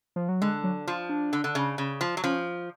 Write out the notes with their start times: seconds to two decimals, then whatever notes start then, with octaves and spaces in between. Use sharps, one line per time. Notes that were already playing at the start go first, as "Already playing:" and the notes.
0.16 F3
0.29 F#3
0.41 D3 G#3
0.64 F#3
0.87 F3 F4
1.09 D4
1.33 D3
1.44 D3
1.55 C#3
1.78 C#3
2.01 F3
2.17 F#3
2.24 F3 C#4